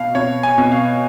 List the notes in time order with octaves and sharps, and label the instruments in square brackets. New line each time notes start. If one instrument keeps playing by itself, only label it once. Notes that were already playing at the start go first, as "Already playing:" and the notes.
Already playing: [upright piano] B2 [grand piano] F5
[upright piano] B2 [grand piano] C#5
[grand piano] G#5
[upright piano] B2
[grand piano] F5